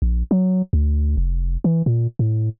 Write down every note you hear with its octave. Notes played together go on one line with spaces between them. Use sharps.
A#1
F#3
D2
F1
E3
A#2
A2